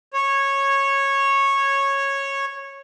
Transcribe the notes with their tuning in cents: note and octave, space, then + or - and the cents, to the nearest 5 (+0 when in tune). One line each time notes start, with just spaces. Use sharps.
C#5 -10